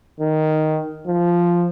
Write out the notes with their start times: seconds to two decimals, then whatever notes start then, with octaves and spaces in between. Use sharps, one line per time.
0.20 D#3
1.07 F3